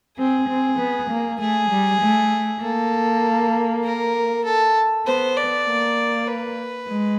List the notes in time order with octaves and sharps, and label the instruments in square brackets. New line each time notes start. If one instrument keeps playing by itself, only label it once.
[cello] C4 [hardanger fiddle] G#4
[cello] C4
B3
A#3
[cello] A3 [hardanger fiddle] G#4
[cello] G3
A3
[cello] A#3 [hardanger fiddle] A4
[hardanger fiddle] A#4
A4
[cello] B3 [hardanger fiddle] C5
[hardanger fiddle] D5
[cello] A#3
[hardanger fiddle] B4
[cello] G#3